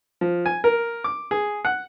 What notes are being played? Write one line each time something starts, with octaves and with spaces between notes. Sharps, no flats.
F3
G#5
A#4
D6
G#4
F#5